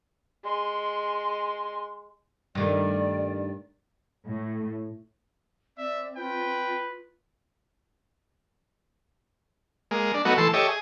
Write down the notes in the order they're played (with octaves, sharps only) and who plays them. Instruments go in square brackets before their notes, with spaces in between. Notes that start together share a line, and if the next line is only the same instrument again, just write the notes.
[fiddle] G#3 C6
[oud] G2 D#3 A3 [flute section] D5
[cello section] A2
[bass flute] C4 [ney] D5 [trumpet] E5
[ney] F4 [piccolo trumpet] B4 [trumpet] G5
[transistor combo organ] G#3 A#3
D4
F#3 A3 B3 D#4 F#4
E3 A3 A4 C6
G4 A4 C#5 D#5 E5
G#4